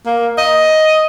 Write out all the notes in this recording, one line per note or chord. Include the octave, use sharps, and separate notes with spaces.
A#3
D#5